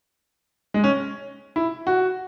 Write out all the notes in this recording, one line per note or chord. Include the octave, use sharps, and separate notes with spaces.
G#3
C#4
E4
F#4